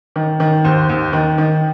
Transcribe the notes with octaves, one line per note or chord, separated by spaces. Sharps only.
D#3
D#3
D#2 C5
D#2
D#3
D#3